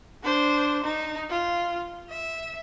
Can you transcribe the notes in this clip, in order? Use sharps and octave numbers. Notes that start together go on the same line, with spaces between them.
D4 C5
D#4
F4
E5